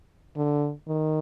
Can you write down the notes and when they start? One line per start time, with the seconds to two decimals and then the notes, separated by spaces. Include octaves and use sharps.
0.36 D3
0.87 D#3